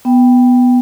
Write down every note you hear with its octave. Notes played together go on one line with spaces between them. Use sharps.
B3 G5